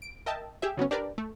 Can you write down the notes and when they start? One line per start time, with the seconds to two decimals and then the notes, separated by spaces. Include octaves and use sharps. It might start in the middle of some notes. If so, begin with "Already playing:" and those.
0.02 D7
0.26 A#4 D#5 E5 G5 A5
0.62 G4 G#4 E5
0.77 C#3 F#3 B3 C#4
0.91 D4 G4 A#4 B4 D5
1.18 A3